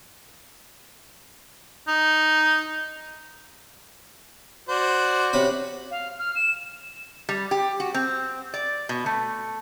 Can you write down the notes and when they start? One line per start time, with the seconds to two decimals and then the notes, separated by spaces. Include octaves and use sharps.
1.87 D#4
4.69 F#4 C5 D5
5.33 C3 C#4 B5
5.91 F5
6.19 F6
6.36 E7
7.29 G3
7.51 G4
7.80 F#4
7.94 C4
8.54 D5
8.89 B2
9.06 A3